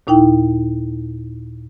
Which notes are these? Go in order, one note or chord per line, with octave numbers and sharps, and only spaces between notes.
D#2 A#2 D#4 E4 G5